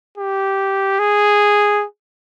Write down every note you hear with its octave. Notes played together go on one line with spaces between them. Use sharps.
G4
G#4